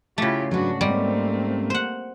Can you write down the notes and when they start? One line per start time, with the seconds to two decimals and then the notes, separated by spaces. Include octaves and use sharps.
0.18 C#3 A3 E4 F4 G4
0.51 G#2 F#3 D4 F#4 B4
0.81 G#2 G3 A3 A#3 C4 C#4
1.70 C5 F#5